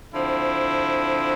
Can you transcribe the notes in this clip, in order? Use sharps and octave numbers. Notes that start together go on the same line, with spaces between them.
D3 F3 C4 E4